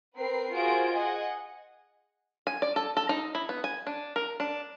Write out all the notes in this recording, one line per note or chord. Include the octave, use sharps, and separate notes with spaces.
C4 A#4 B4 C7
F4 F#4 G#4 A#4 C5 D7
G#4 D#5 F#5 G#5
G#5
D5
A4
A4
D#4
E4
B3
G#5
D4
A#4
D4